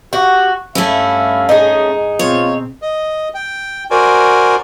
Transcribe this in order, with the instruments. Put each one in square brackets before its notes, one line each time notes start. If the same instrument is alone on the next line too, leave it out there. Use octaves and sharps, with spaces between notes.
[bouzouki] F#4 [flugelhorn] G4
[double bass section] G2 [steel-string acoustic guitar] A3 C#4 [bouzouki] E4 [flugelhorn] F5
[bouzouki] D#4 G#4 [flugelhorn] D#5
[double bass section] B2 C4 [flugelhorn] F4 [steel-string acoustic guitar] C#5
[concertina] D#5
G5
F#4 A#4 C5 D5 G#5